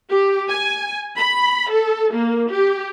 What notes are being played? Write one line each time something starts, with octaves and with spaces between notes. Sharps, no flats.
G4
G#5
B5
A4
A#3
G4